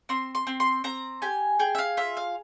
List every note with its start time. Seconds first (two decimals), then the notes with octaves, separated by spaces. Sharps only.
0.09 C4 C6
0.35 C6
0.47 C4
0.60 C6
0.84 C4 A#5
1.22 G4 G#5
1.59 G#4 G5
1.75 E5
1.78 F5
1.97 F4 E5
2.17 F5